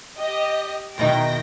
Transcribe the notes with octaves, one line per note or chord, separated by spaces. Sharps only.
G4 D#5
E2 B2 D#3 D#4 G5 A#6